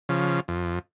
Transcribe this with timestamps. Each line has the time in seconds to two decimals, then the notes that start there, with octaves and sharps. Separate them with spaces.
0.09 C#3 F3
0.48 F2